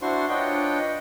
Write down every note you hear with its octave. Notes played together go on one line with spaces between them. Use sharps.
D4 E4 F#4 C5 C6 C#6
D4 F4 B4 C#5 D#5 G5